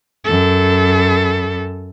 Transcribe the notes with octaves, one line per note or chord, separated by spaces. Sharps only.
F#2 A4